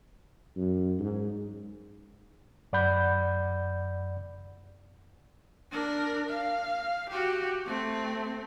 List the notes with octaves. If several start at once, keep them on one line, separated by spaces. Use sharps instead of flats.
F#2
G#2
F#2 D5 F#5 B5 G6
D4 A#4
F5
F#4 G4
A3 C4